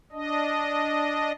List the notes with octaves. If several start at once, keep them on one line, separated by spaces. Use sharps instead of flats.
D4 D#5